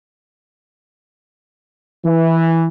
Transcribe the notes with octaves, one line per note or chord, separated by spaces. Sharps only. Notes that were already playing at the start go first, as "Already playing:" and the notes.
E3